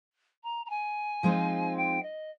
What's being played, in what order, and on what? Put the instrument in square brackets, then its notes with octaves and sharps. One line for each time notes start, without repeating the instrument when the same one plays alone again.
[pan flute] A#5
A#5
G#5
[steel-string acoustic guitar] F3 G#3 C4 D#4
[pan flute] G5
D#5